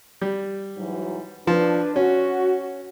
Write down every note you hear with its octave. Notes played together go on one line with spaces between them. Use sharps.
G3
G#2 E3 F#3
F3 D4 B4
C#4 F#4